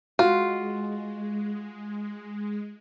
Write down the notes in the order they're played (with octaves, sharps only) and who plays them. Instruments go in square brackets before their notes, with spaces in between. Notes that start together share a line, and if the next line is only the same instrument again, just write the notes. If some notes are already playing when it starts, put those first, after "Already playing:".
[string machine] G#3 [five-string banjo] F4 [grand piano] F#4